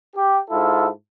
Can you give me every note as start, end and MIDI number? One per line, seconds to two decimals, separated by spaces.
0.16 0.39 67
0.50 0.88 44
0.50 0.88 64
0.50 0.88 65
0.50 0.88 69